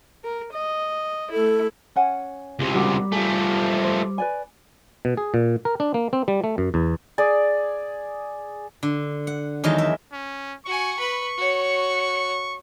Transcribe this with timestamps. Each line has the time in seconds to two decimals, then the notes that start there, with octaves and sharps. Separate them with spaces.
0.24 A#4
0.53 D#5
1.32 A3 E4 A4
1.96 C#4 F#5 G#5
2.59 C#2 C3
2.75 G3 D4 F#4 A#4
3.12 F3 A3 G#4
3.83 C5
4.18 B4 D5 G#5
5.05 B2
5.17 G#4
5.34 A#2
5.65 A#4
5.80 D4
5.94 A#3
6.13 C4
6.28 G3
6.44 A3
6.58 F#2
6.74 E2
7.18 G#4 D5
8.83 D3
9.27 F#5
9.64 E2 D#3 F#3 G#3 A5
9.78 E5
10.12 C#4
10.66 F#4 G#5 C#6
10.99 B4 B5
11.38 F#4 C#5